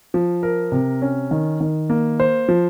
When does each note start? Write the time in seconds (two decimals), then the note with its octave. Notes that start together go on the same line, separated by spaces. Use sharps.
0.14 F3
0.43 A#4
0.72 C3
1.02 C#4
1.31 D#3
1.60 D#3
1.90 A#3
2.20 C5
2.49 F3